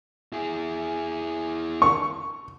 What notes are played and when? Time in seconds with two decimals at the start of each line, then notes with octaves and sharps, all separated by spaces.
0.33 E4 G#4
1.82 C#6